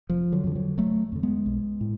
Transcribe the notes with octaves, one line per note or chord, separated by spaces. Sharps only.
F1 F3
D3 F#3
F2 D3
D3 F#3
F1 F#3 A3
F2 D3
G#3 B3
B1
A2